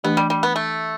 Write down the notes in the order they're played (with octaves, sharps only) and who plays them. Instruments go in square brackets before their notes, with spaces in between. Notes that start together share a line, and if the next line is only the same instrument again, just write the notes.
[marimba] E3 A3 D4 G4 [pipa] B3
[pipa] G3
G3
B3
A3